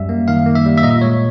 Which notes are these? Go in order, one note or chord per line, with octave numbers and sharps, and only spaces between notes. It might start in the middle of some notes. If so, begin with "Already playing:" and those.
Already playing: F#2 G3 E5
A#3
D#3 F5
A#3
E5
G3
E5
A#2 D#5
G#3 C#5